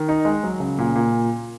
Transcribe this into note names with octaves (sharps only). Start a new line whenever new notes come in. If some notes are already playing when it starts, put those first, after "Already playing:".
Already playing: D#3
D#4
G#3
F#3
C#3
A#2
A#2